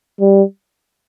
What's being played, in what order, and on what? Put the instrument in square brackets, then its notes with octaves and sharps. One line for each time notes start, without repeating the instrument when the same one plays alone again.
[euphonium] G3